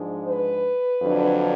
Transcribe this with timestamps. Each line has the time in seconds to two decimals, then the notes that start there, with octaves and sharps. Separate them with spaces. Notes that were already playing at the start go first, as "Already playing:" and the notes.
Already playing: G#2 F3 G#3 D4
0.26 B4
1.02 F2 D3 F#3 D4